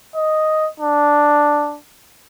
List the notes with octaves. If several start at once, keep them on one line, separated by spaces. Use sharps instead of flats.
D#5
D4